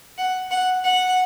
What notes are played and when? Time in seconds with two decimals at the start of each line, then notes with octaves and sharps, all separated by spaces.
0.18 F#5
0.51 F#5
0.84 F#5